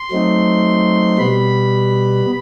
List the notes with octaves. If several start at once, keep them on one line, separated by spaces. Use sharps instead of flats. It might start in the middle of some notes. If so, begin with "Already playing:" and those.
Already playing: C6
F#3 A3 C4 D#4
B2 G3 B3 B5